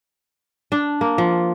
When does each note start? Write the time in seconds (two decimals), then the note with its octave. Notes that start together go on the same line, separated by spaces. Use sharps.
0.72 D4
1.01 A#3
1.18 F3